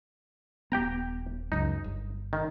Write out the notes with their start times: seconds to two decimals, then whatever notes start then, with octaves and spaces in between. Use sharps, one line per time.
0.72 D#1 B3 G4 G5 A#5
1.52 C#2 F#2 D#4
1.84 G1
2.33 D#3